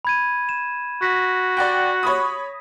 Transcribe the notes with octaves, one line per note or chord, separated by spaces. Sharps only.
B5 G#6 D#7
E7
F#4 A#6 B6
D5 F#5 G5
C#5 B5 D#6